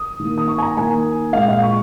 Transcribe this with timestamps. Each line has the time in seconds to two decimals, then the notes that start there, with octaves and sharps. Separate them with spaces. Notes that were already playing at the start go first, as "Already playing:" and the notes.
Already playing: D#6
0.20 D#3 A#3
0.38 D#6
0.48 C#6
0.58 G#5
0.62 A#5
0.77 D#3 A#3 G#5
1.33 A#2 G#3 F5
1.48 F5
1.62 C#6